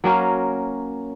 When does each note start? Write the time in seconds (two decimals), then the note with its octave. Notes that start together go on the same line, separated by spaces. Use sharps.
0.04 F#3 A#3 C#4